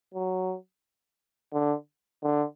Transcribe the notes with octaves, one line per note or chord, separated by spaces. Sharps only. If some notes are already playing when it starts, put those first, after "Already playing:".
F#3
D3
D3